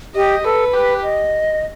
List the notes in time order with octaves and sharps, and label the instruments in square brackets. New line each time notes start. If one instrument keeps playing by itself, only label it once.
[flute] G4 [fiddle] D#5
[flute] A4 [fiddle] B4
[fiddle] G4 [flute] B4
[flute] D#5